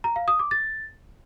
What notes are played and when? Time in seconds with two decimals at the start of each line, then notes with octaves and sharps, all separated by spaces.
0.04 A#5
0.16 F5
0.28 D#6
0.39 D6
0.51 A6